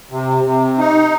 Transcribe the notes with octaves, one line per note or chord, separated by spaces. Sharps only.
C3
C3
D#4